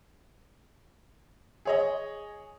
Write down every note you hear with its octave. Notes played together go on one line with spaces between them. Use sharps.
G#4 C#5 D#5